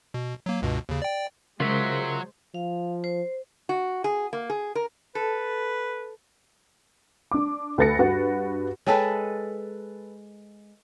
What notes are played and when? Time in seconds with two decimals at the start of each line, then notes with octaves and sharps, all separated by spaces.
0.14 B2
0.46 F#3 A#3
0.62 C#2 G2 B2
0.89 D#2 C#3
1.02 D5 G5
1.60 C#3 F#3 G#3 F4 A#4 C5 E5
2.54 F3 F5
3.04 C5
3.69 F#4
4.04 G#4
4.33 A#3
4.50 G#4
4.75 A#4
5.15 A4 B4
7.31 D4 D6
7.78 D2 A4 B4 A6 A#6 C#7
7.99 G2 F#4 B4
8.87 G#3 A4 B4 C#5 G5 A5